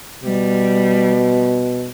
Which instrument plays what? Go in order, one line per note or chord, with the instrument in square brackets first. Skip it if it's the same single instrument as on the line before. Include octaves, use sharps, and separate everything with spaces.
[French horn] B2 [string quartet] G3